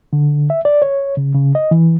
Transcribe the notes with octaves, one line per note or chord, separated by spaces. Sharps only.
D3
E5
D5
C#5
C#3
C#3
D#5
E3